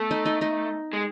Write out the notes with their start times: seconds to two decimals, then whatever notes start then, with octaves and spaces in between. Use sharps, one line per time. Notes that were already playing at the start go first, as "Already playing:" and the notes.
Already playing: A3 B3
0.11 D#4 D#5
0.25 D#4 D#5
0.41 D#4 D#5
0.93 G#3